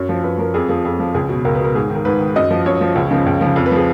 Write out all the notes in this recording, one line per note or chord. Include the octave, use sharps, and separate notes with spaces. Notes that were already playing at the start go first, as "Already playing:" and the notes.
Already playing: F#2 C#5
F3
F#2 B4
F3 A#4
F2 G#4
F3 G#4
F2 G#4
F3
C#2 G#4
B2
C#2 A#4
B4
B2 A#4
G#2 G#4
D#3
A#4
G#2 B4
D#3
F#2 D#5
F3
F#2 C#5
F3
C#2
C#3 F3
C#2
C#3 F3
F2
B4
F3 G#4